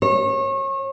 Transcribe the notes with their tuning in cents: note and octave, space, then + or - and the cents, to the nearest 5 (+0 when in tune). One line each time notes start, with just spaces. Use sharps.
C#5 -35